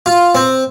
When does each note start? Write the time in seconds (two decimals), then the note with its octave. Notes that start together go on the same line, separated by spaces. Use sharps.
0.06 F4
0.35 C4